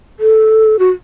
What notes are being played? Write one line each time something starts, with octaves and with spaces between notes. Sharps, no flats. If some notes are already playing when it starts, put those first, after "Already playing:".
A4
F#4